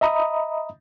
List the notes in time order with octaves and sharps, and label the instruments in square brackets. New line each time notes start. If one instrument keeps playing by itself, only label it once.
[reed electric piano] D#5 E5 A#5 B5 D#6